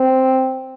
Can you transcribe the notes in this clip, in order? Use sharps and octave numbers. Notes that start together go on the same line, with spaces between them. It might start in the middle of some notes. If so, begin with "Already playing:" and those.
Already playing: C4